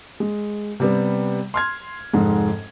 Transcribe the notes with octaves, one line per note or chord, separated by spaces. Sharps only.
G#3
C3 G3 B3
C6 F6 G#6
F1 G#2 G#3